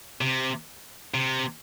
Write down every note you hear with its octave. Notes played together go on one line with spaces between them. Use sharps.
C3
C3